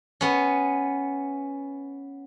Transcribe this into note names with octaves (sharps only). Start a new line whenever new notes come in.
B3 C#4